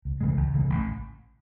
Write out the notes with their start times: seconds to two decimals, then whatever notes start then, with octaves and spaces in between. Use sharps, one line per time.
0.05 C#2
0.21 C#3 E3 G#3
0.37 C#2
0.54 C#3 E3 G#3
0.70 A1